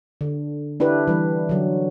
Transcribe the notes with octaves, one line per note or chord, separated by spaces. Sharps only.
D3
D4 E4 G4 B4
E3 G3
D3 F#3